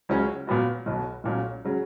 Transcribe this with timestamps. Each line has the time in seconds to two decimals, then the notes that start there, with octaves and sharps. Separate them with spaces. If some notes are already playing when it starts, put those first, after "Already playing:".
0.09 C#2 C#3 F#3 C#4
0.47 A#2 F#3 B3 F#4
0.86 B1 B2 F#3
1.24 B1 A#2 F#3 C#4
1.65 C#3 F#3